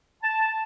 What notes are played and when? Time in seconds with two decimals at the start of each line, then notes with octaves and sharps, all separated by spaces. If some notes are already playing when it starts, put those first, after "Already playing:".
0.23 A5